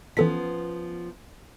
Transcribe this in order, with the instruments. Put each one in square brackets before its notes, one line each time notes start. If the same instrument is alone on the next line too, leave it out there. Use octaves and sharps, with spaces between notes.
[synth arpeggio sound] E3 A4 B6 [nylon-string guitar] F3 B3 C#4